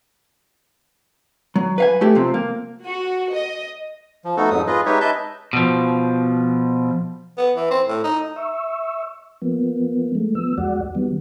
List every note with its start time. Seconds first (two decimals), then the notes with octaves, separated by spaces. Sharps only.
1.56 F#3
1.78 B4 F5 G#5
2.01 A3 E4 G4 A4
2.15 C3 F3 C4
2.34 A#3
2.85 F#4
3.33 D#5
4.25 F3
4.37 A3 B3 D#4 F#4 A4
4.51 F2 G#2 F#3 D#6
4.67 F4 G#4 B4 D#5
4.86 G#3 D#4 G4 B4 C#5 E5
5.01 B4 D#5 E5 A5 G6
5.53 B2 F3
7.38 B3
7.56 E3
7.71 C4
7.88 A2
8.04 D#4
8.36 E5 C#6 E6
9.42 F3 A#3 B3
10.15 G#3 A3
10.35 F3 B3 E6
10.58 E2 G#3 F#4 D5 F#5
10.95 D#3 F#3 G3 B3